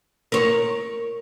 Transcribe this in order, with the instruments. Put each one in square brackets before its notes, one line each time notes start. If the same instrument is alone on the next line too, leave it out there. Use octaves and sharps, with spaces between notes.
[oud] A#4 C#5